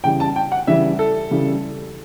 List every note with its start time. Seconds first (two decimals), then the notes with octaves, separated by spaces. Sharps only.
0.04 C#3 E3 G3 G5
0.20 A5
0.36 G5
0.52 F#5
0.67 C#3 E3 G3 E5
0.99 A4
1.31 C#3 E3 G3